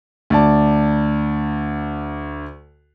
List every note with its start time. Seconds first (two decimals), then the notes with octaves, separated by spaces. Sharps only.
0.30 D2 D5 A5